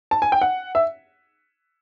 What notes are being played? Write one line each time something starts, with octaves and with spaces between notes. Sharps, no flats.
A5
G#5
G5
F#5
E5